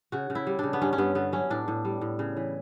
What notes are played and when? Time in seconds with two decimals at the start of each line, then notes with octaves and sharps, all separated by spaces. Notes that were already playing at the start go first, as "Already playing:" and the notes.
0.12 C#3 F#4
0.30 C#3
0.35 E4
0.47 G3
0.59 C#3 D4
0.73 B3
0.82 G2 C#4
0.93 C#4
0.98 G2 B3
1.15 D3 B3
1.32 F#3 C#4
1.50 A2 D4
1.68 A2
1.85 G3
2.01 A2
2.19 C#3
2.37 E3